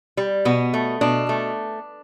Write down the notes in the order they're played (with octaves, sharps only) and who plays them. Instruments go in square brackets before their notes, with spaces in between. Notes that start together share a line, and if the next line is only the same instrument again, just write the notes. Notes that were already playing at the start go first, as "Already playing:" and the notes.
[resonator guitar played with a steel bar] G3
B2 B3
A3
B2 D4
A3